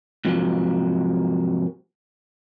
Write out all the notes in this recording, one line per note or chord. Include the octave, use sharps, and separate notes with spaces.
G#2 C3 F3 F#3 G#3 A#3